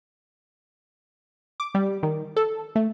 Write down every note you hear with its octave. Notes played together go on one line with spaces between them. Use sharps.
D6
G3
D#3
A4
A3